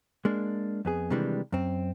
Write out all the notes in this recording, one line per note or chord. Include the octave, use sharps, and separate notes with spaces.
G#3 A#3 D4
F2 B3 G#4
C3 D#3 E3 G3 G#3 D4
F#2 C4